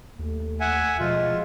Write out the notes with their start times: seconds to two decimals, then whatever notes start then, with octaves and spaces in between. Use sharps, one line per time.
0.19 D#2 A3
0.60 E5 F#5 G#5
1.00 B2 F3 G#3 F4